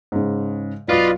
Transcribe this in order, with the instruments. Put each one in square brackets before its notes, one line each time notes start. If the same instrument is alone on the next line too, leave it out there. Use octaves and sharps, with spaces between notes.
[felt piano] G#2 C#3
[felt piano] B1 F#4 [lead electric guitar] F4 [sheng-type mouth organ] B4 D5 D#5